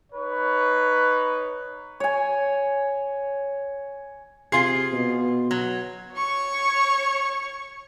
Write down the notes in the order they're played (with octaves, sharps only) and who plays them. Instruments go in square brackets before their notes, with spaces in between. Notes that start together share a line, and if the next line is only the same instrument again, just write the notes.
[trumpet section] D#4 B4 C#5
[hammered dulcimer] C#5 G#5
[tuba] C3 [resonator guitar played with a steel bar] F4 G#4 [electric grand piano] C6 C7
[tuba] B2
[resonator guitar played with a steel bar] F#3
[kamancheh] C#5 C#6